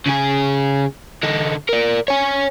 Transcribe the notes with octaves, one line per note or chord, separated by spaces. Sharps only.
C#3 G#4
D3 D#4
A#4 D5
C#5 G#5